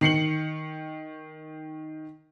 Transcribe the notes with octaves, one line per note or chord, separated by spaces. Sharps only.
D#3 C7 C#7 F#7